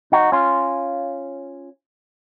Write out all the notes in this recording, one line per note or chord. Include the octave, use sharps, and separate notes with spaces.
D#4 F#4
C#4 F4